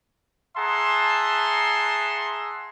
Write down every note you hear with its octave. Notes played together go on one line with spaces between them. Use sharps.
G#4 E5 F#5 A5 A#5 C6